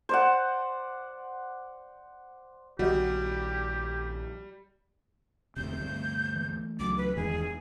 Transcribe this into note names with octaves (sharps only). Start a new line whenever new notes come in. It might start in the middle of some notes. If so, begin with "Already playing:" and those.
C5 D5 F#5
A#1 D#3 G3 F#4 G4 D#5
E1 D2 C3 G6
D2 G2
E3 A3 A#3
C#2 F#3 D6
B4
D#1 E2 G2 A#2 D#3 G#3 G#4